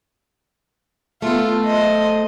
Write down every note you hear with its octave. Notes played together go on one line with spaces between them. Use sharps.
A3 B3 F4 A4
C5 D#5